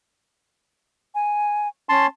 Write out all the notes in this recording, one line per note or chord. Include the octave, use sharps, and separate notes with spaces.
G#5
C#4 A5 C6